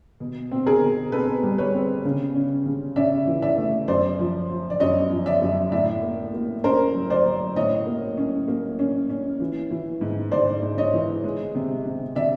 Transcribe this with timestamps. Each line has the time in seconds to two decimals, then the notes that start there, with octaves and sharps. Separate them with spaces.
0.20 B2
0.51 C4
0.66 G#4 A#4
0.82 B2
1.12 C4 A4 B4
1.43 G3
1.58 B4 C#5
1.74 C4
2.05 C#3
2.35 C#4
2.66 C#3
2.96 C#4 D5 E5
3.27 E3
3.42 D5 E5
3.58 A3
3.88 F#2 C5 D5
4.19 F3
4.50 F3
4.70 D5
4.80 F#2 C#5 D#5
5.11 F3
5.26 D5 E5
5.42 F#2
5.72 A2 D5 E5
6.03 A#3
6.34 A#3
6.64 C#4 A#4 C5
6.95 F#3
7.10 C5 D5
7.26 F#3
7.56 A2 C#5 D#5
7.87 A#3
8.17 C#4
8.48 A#3
8.79 C#4
9.10 C#4
9.40 E3
9.71 E3
10.01 G#2
10.31 G#2 C5 D5
10.62 G#2
10.78 C#5 D#5
10.93 E3
11.24 G#3
11.55 C3
11.85 C3
12.16 C3 D5 E5